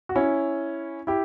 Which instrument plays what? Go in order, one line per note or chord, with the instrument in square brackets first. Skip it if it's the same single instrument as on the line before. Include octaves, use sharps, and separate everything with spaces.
[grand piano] F#4
C#4 E4
E4 G4